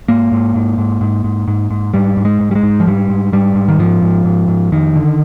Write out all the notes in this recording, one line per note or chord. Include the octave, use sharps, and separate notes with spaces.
G#2 A#3
G#2
G#2
G#2
G#2
G#2
G#2
G#2
G#2 G3
G#2
G#3
G#2
G3
G#3
G#2
F3
G#2 G3
G#2
G#2 G3
G#2
D#3
G#2 F3
G#2
G#2
G#2
F2 D#3
D3